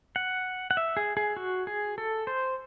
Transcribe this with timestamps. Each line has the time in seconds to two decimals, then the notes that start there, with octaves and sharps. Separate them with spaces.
0.16 F#5
0.71 F#5
0.77 E5
0.97 G#4
1.17 G#4
1.37 F#4
1.67 G#4
1.98 A4
2.27 C5